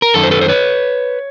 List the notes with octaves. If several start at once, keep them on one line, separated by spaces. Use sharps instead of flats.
A#4
F#2 D#3 A4
C5
A4 B4
C5
B4 C#5